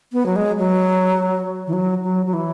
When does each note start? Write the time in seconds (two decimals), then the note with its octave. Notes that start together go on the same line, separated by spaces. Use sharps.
0.13 B3
0.26 F#3
0.36 G#3
0.59 F#3
1.67 E3
1.73 F#3
2.03 F#3
2.26 F#3
2.33 E3